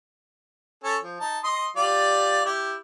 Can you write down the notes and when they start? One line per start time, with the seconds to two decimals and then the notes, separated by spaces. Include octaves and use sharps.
0.84 C#4 A4
1.02 F3
1.20 D#4 A5
1.44 D#5 C6 D#6
1.76 G3 F4 D5
2.46 E4 G4